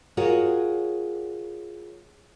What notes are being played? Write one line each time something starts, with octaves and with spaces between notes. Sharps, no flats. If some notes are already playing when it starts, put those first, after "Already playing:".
F4 F#4 G#4 A#4 C#5